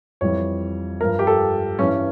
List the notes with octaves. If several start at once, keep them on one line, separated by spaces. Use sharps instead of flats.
F2 E3 G3 C#5
G2 F3 A#4
G4
A4
G2 E3 G3 C#4